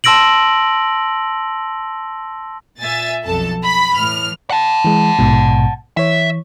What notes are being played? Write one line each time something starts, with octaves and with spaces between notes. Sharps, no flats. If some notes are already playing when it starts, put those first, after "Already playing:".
A5 C6 E6 A#6 D7 F#7
A#2 E5 G#5 A6
B1 F2 A4 A5
B5 B6
A2 E3 F6
F#5 A5
E3 G#3
A#1 G#2 B2
E3 C#5 E5